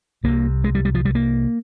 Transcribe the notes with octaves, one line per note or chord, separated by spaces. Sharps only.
C2 C3 A#3
G#3
G3
G3
F3
G3
A#3